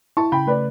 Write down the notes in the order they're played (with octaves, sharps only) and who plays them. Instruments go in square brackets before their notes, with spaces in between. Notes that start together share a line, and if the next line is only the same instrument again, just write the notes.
[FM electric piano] E4 [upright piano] A5 C#6
[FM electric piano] C#3 [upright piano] G5 B5
[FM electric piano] A3 [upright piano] B4 D5